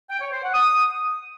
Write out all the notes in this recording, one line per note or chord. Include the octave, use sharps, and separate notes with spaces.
G5
C#5
C5
F#5
D#6